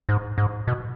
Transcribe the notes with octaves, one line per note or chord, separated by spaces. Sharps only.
G#2
G#2
B2